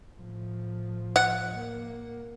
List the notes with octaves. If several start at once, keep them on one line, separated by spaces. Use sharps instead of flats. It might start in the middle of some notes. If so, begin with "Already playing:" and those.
A2 F3
F#5
A#3